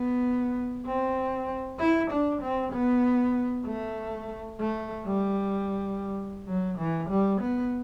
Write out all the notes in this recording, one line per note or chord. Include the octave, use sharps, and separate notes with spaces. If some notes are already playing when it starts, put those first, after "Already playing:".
Already playing: B3
C4
E4
D4
C4
B3
A3
A3
G3
F#3
E3
G3
B3